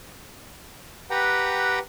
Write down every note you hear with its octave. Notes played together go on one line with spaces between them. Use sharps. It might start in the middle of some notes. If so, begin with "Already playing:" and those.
G4 B4 F#5 G5 A#5